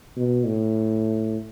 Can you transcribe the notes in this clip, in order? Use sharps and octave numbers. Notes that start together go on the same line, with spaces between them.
B2
A2